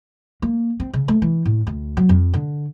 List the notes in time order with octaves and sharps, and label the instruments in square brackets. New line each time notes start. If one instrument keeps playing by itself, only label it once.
[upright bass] A#3
C4
C#3
A3
E3
A2
D2
F#3
F2
D3